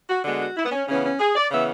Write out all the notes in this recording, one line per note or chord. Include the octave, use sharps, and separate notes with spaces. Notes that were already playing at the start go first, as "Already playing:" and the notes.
F#4
D3 G#3 B3 F#4
F#4
E4
B3
C#4
C#3 E3 B3 C#4
C#4
G#4
D5
C#3 E3 B3 E5